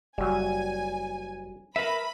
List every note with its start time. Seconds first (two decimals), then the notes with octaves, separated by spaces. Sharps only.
0.18 F#1 F#3 G3 G#5
1.76 A#4 B4 E5 B5